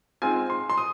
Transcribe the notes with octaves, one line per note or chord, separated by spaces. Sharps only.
G#2 G#3 C4 F4 G#5
C6
C6
D#6